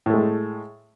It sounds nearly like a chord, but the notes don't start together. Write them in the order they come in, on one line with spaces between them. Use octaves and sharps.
A2 A3 G#3